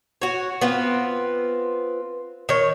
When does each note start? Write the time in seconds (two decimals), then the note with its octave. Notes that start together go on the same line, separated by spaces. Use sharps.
0.22 F#4 C#5
0.61 B3 C4 F4
2.49 D#3 C#5